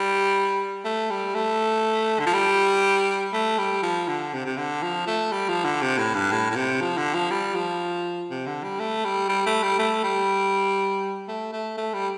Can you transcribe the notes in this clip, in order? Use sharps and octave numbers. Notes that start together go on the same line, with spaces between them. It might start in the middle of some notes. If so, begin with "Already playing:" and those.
Already playing: G3
A3
G3
A3
D3
F3
G3
A3
G3
F3
D3
C3
C3
D3
F3
A3
G3
F3
D3
C3
A2
G2
A2
A2
C3
F3
D3
F3
G3
F3
C3
D3
G3
A3
G3
G3
A3
G3
A3
G3
A3
A3
A3
G3